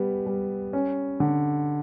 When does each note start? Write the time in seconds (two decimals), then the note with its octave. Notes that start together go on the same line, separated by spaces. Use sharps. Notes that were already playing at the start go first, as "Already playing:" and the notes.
Already playing: G3 B3
0.27 G3
0.73 C#4
1.20 D3